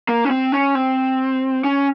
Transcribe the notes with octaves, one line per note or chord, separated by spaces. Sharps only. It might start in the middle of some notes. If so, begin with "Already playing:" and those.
A#3
C#4
C4
C#4
C4
C#4